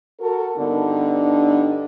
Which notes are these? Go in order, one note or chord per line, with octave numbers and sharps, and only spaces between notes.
F#4 A4 A#4
G2 D3 B3 D4 D#4